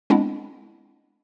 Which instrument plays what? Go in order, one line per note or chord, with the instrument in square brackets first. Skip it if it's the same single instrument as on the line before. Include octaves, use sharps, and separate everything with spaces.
[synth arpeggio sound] G#3 B3 C4 D4 E4